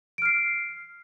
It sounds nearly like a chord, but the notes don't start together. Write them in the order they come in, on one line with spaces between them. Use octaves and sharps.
D7 F6 C7